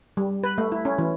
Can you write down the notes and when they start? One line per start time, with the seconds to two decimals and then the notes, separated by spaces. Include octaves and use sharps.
0.17 G3
0.43 B4
0.58 A3
0.72 E4
0.85 C#4
0.98 E3